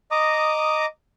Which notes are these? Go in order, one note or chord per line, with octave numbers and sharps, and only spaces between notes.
D#5 A#5 D6 D#6